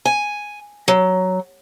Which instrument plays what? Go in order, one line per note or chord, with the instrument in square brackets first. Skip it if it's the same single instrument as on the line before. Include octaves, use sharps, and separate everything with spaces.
[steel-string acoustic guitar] G#5
F#3